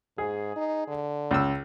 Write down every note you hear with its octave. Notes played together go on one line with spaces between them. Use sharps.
G#2 G#4
D#4
D3
C#2 E6